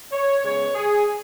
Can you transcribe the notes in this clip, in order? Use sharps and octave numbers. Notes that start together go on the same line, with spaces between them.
C#5
C#3 G#3 B3 C#5
G#4